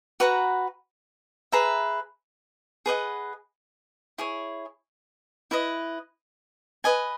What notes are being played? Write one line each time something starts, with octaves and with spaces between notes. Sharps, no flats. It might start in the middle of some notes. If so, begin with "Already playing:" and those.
F#4 B4 F#5 A#5
G#4 B4 E5 A#5
G#4 B4 D#5 F#5
E4 G#4 C#5
E4 B4 D#5
B4 D#5 G#5